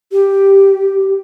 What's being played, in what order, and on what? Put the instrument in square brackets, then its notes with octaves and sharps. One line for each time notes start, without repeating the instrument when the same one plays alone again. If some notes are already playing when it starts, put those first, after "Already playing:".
[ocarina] G4